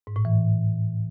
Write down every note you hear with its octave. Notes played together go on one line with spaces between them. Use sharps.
G#2
A2
E3